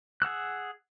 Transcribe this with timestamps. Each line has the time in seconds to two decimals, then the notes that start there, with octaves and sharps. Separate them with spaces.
0.22 G#4 F#5 E6 F#6